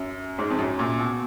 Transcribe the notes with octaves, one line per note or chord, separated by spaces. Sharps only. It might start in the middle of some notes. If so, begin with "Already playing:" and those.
Already playing: F#2
G#2
F2
F#2
A#2
B2